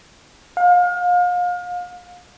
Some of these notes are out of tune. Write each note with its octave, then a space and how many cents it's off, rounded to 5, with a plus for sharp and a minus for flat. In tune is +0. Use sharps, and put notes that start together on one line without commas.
F5 +35